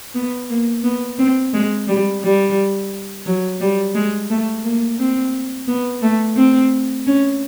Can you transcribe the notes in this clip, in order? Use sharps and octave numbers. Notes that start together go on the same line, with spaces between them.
B3
A#3
B3
C4
G#3
G3
G3
F#3
G3
G#3
A3
A#3
C4
B3
A3
C4
C#4